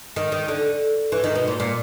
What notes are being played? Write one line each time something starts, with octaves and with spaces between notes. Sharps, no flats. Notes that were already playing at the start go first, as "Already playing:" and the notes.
D#3
D#3
D3
E3
D#3
B2
A#2
A#2